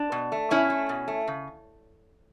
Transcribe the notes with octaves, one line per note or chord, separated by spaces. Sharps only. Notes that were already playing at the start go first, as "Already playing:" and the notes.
Already playing: D4
B2
A3
B2 C#4 E4
A3
B2
A3
C#3